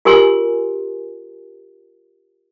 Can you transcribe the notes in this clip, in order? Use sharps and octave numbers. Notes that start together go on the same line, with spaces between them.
F4 G4 A#4 G#5 C6